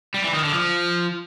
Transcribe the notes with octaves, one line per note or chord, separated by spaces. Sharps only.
G3
E3
D#3
D3
F3